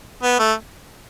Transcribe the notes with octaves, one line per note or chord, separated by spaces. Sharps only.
B3
A3